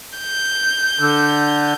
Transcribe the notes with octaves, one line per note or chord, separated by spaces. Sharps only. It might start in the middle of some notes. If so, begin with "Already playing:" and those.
G6
D3